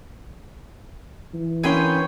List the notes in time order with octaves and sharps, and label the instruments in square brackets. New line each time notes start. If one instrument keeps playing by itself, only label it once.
[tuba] E3
[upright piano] D3 A#3 C#4 [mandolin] G#4 B4 G5 [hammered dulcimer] C#5 C6